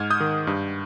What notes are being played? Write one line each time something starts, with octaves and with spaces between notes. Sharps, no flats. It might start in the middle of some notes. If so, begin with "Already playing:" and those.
Already playing: G#2 F6 G#6
D#6 G6
D#3
G2